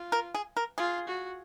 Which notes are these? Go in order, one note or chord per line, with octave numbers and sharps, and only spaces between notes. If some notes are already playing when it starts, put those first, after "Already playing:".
Already playing: F4
A#4
G#4
A#4
F4 G#4
F#4